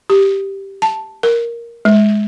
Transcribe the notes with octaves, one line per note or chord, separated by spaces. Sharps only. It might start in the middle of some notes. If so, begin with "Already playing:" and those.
G4
A5
A#4
G#3